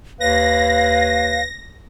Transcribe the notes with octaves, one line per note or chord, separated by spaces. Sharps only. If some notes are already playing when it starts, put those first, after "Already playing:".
D#2 B4 C#5 F5 A#6